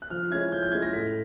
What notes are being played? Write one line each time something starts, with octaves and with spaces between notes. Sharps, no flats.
F#6
F3 F6
G#3 C#4 E4 G#6
F3 G6
G6
G#3 C#4 E4 G#6
A#6
A2 B6